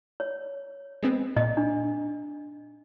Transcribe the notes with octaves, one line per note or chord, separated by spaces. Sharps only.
C#5
G#3 B3 C4
A#2 D#5
D4